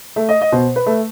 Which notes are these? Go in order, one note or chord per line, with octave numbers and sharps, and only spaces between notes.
A3
D#5
D#5
B2 C5
B4
A3